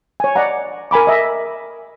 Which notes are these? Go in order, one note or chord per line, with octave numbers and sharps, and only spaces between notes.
C#5 G#5
D5 D#5 F#5 A#5
A#4 G#5 B5 D6
D#5 E5